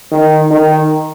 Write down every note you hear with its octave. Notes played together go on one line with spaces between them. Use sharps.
D#3
D#3